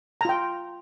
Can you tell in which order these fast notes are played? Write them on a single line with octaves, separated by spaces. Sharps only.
A#5 F4 G5